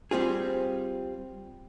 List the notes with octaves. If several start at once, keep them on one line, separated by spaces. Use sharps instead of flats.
G3 C4 F4 G#4